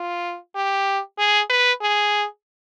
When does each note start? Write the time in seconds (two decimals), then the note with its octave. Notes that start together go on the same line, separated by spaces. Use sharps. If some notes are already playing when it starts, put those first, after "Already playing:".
Already playing: F4
0.55 G4
1.18 G#4
1.50 B4
1.81 G#4